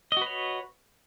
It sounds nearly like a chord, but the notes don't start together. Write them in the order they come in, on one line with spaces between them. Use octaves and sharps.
D#5 F#4 B4 C#5